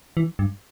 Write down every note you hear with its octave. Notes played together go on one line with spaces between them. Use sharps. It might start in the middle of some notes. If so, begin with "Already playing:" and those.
E3
G2